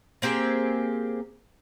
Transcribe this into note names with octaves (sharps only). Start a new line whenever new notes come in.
A#3 C4 G4 G#4